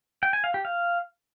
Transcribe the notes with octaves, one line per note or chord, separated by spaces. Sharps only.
G5
G#5
F5
G4
F5